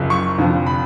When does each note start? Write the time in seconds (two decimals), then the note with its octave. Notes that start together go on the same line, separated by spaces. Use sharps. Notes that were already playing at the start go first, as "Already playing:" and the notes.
Already playing: F#1 F#2 F3
0.10 C#6
0.38 F1 F2 D3 F3
0.67 B5